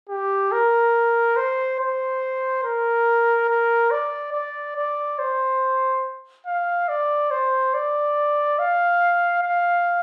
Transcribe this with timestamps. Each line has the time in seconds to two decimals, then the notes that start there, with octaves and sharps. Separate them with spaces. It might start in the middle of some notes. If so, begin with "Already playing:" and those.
0.09 G4
0.52 A#4
1.36 C5
1.79 C5
2.63 A#4
3.49 A#4
3.91 D5
4.33 D5
4.77 D5
5.19 C5
6.46 F5
6.88 D5
7.31 C5
7.74 D5
8.59 F5
9.43 F5